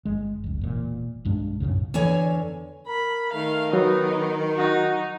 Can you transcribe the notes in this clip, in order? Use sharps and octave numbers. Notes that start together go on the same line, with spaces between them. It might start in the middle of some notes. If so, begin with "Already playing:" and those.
G1 G#3
F1 C#2
E1 A#2
B1 G2 G#3 D4
B1 F#2 A2 C#3
E2 D3 C#5 G#5
A#4 B5
D#3 A3 F5
F#3 B3 D#4
D#4 F#4